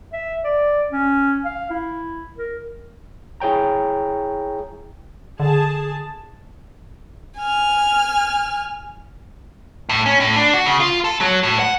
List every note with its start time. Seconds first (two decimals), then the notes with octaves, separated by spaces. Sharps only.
0.13 E5
0.44 D5
0.92 C#4
1.45 F5
1.70 E4
2.38 A#4
3.40 E4 G#4 C#5 G5 A#5
5.40 D3 G#4 A5
7.38 G#5 F6
9.89 A2
10.06 C#4
10.20 A2
10.36 D4
10.54 F#4
10.66 C#3
10.80 F4
11.04 A4
11.21 F#3
11.43 A2
11.59 F#5